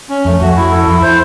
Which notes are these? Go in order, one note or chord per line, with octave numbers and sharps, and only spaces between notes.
C#4
F2 A3
F2 F#4
E4
A4
F2 E4
C5